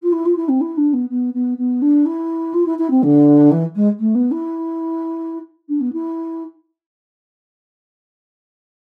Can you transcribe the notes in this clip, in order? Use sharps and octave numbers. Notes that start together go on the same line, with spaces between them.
F4
E4
F4
E4
C4
E4
D4
B3
B3
B3
B3
D4
E4
F4
E4
E4
C4
D3
E3
G#3
A3
B3
E4
D4
B3
E4